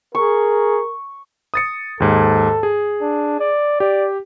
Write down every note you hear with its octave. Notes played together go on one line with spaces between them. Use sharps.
G#4 A#4 C#6
D#6 A6 C#7
D#2 G#2 A4
G#4
D4
D5
G4 D5